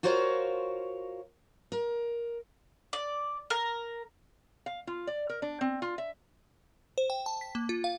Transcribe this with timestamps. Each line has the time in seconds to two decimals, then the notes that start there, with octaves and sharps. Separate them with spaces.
0.03 F4 F#4 A#4 C5 C#5 F5
1.72 A#4
2.93 D5
3.50 A#4
4.66 F5
4.87 F4
5.07 D5
5.30 A#4
5.42 D4
5.61 C4
5.82 F4
5.98 E5
6.98 C5
7.10 G5
7.26 A5
7.41 B6
7.55 A#3
7.69 F4
7.84 F5